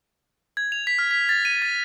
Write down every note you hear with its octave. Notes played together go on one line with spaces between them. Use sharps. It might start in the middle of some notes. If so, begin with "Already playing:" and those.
G#6
F7
B6
F6
B6
A6
D#7
A6